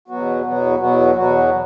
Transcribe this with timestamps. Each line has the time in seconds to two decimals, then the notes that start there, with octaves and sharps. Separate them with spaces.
0.08 E2 B2 F#3 B3 F#4
0.44 E2 B2 F#3 B3 F#4
0.79 E2 B2 F#3 B3 F#4
1.14 E2 B2 F#3 B3 F#4